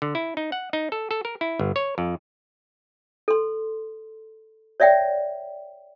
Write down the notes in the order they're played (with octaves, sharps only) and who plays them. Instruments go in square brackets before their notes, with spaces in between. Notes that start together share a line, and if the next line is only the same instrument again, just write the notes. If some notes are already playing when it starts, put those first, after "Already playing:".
[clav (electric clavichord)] D3
E4
D#4
F#5
D#4
A4
A4
A#4
E4
G1
C#5
F2
[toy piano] A4 C6
C#5 D5 E5 F#5 G5